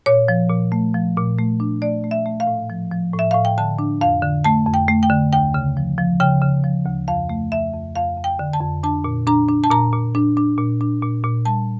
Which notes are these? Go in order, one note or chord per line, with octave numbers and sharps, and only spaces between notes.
A#2 C#5
F3
A#2
A3
F3
A#2
A3
D4
A3 D5
A3
E5
A3
F5
A2
F3
F3
A2
E5
A2 F5
G5
D3 A5
D4
F2 F5
D3
A3 A5
F2
G5
A3
G5
D3
D2 G5
C#3
F3
F3
C#3 G5
C#3
F3
D2
F2 F5
A3
F2 E5
F2
F2 F5
F2
G5
D3
A5
F2
D4 A5
A#2
D4 A#5
D4
A5
A#2 A#5
A#2
D4
D4
A#2
D4
A#2
A#2
G3 A5